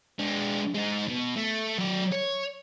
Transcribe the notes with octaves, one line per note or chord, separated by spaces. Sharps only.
G#3 D4
G#3 D#4
B2
A3
F#3 D5
C#5